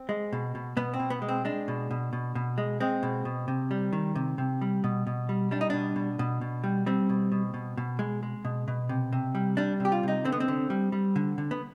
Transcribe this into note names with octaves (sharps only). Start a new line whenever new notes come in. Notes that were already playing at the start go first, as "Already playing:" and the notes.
Already playing: C4
G#3
B2
B2
B2 B3
C4
B2
B3
G#3
C4
G#3 D4
B2
B2
B2
B2
G#3
G#3 C4
B2
B2
C3
G3
D#3
C3
C3
G3
B2
B2
G3
G3 D4
D#4
B2 D4
B2
B2
B2
G3
G3 C4
B2
B2
B2
B2
G#3
G#3
B2
B2
C3
C3
G3
G3 D4
C3 G4
F4
C3 D#4
D3 C4
B3
C4
D3
G3
G3
D3
D3
B3